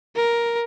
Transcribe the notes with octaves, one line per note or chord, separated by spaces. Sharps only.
A#4